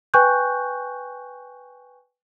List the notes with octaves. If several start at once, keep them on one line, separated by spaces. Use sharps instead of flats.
B4 G5 G#5 C#6 F#6 G6